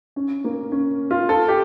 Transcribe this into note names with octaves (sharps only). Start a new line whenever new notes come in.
C#4
A#3
C#4
F4
A4
G4